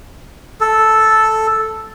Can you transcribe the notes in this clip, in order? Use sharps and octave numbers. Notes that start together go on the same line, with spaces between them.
A4